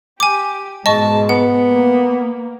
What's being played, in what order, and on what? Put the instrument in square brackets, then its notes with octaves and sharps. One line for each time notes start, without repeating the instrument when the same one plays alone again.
[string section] G4 [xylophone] G#5 D6
[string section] G#2 B2 G#3 [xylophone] D#5 C#6 [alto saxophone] A5
[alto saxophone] B3 [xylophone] F#5
[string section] A#3